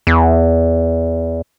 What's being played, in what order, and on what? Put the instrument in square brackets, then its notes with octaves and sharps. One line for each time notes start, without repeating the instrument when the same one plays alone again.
[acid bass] E2